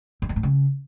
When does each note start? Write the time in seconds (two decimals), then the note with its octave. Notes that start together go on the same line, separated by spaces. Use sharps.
0.22 F#2
0.29 F2
0.36 A2
0.43 C#3